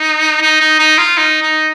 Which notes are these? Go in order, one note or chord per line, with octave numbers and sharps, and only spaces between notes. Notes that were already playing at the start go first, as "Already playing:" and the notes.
Already playing: D#4
D#4
D#4
D#4
F4
D#4
D#4